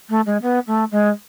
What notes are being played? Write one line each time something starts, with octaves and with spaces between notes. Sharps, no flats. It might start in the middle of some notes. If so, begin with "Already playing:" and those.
A3
G#3
B3
A3
G#3